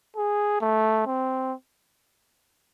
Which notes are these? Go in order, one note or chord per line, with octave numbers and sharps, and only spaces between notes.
G#4
A3
C4